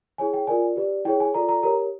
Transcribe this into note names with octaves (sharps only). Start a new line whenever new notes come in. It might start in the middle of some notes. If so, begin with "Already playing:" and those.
E4 G#4 C#5 G#5
G5
F4 A#4 D5 G#5
G4 B4 D5
E4 G#4 C#5 G5
G#5
F4 A4 D5 A#5
A#5
G4 A#4 C#5 A#5